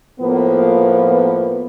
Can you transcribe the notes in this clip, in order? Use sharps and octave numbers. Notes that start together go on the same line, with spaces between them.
A2 F3 A#3 B3